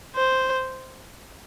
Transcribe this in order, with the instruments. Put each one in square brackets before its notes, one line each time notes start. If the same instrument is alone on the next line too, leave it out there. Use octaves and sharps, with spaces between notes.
[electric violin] C5